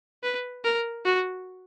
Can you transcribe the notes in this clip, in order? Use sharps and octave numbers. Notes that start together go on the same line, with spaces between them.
B4
A#4
F#4